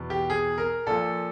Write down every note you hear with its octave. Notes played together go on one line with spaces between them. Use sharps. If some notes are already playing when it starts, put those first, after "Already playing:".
Already playing: E2 B2
G4
G#4
A#4
A#2 F3 A4